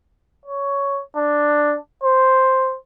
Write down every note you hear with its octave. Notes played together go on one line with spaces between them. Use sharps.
C#5
D4
C5